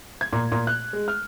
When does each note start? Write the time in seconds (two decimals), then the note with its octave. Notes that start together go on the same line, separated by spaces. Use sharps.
0.21 G#6
0.33 A#2
0.52 A#2
0.67 F#6
0.93 G#3
1.08 F6